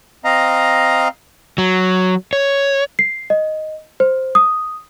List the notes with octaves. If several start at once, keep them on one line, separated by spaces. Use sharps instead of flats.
C4 D#5 F5 A#5
F#3
C#5
C7
D#5
C5
D#6